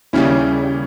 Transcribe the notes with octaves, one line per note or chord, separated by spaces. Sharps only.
D#2 C#3 G3 C#4 E4